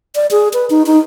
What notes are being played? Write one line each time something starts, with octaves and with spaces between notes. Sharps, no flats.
D5
G#4
B4
D#4
D#4